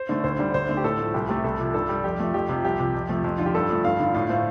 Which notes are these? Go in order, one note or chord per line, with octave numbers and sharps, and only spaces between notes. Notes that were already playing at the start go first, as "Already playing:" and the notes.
Already playing: C5
D3 A3
D2 C5
D3 G3
D2 C5
D3 A3
G4
A2 A4
F3 A3
C2 G4
C3 A3 G4
C2 A4
C3 F3
G2 A4
G3
F2 G4
F3 A3
F2 G4
C3 F3
C2 G4
C3 F3
F2
C3 F3 A3
F2
D3 F3 F4
G4
G2 A4
F3 A3
G2 F5
D3 F3
A2 F5
A3 C5